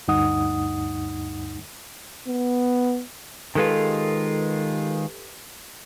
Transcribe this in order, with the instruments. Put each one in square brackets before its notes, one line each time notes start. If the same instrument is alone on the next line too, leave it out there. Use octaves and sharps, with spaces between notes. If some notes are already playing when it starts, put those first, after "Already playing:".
[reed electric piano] D2 G2 D#4 F#5 D#6
[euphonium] B3
[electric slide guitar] D#3 G#3 F4 [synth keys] G4 A4 B4